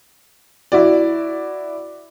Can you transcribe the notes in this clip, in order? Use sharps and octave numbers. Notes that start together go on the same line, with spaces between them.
E4 F#4 D5